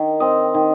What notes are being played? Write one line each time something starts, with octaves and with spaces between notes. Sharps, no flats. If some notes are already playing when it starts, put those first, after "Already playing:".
Already playing: D#3
C4 D#5
D#3